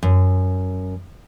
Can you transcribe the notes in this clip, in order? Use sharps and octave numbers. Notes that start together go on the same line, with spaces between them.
F#2